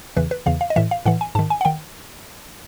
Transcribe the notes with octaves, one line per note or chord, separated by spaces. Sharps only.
E2 C#3 E3 B4
B4
E2 C#3 E3 F5
F5
D#5
A2 E3 E5
F5
A2 E3 F#5
G#5
G#2 D#3 A5
G#5
F#5
D#3 G5